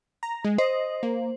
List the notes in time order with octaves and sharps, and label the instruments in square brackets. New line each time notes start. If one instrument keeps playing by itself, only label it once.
[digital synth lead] A#5
G#3
[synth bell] C5 [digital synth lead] D#5
[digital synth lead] A#3